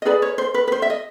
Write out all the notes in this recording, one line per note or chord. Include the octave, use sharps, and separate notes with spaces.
D#5
D#4 G#4 B4 D5
C#5
C5
B4
B4
C5
E5
D#5